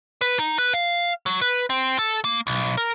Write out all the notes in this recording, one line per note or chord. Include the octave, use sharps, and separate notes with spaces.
B4
D#4
B4
F5
F#3
B4
C4
A4
A#3
B1
A#4